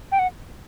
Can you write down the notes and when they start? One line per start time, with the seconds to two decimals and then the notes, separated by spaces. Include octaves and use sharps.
0.12 G5
0.19 F#5